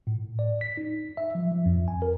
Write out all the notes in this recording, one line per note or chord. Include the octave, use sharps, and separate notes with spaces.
A2
D5
B6
D#4
E5
F3
F3
F2
G#5
A#4